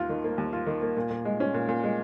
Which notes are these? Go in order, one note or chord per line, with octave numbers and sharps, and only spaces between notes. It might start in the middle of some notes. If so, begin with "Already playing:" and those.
Already playing: D#2 F4
D#3
A#3
D#2
F4
D#3
A#3
A#2
A#2
G#3
C#4
A#2
A#2
G#3